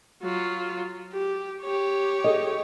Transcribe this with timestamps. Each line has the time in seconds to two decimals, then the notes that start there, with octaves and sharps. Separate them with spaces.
0.22 F#3 F4
1.13 G4
1.62 G4 C#5
2.24 G#4 A4 D#5